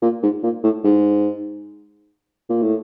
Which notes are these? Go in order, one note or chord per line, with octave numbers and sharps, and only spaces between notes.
A#2
G#2
A#2
A2
G#2
A#2
A2